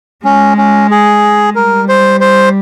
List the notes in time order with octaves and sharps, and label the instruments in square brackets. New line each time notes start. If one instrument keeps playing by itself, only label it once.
[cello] G#3 [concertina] C#4
[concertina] C#4
G#4
[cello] G3 [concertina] A#4
[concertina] C5
C5